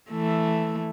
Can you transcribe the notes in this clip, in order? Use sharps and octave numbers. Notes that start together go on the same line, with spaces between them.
E3 A3